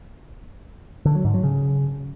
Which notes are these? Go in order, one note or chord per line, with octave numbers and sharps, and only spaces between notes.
D3
F#3
G#2
F#3
C#3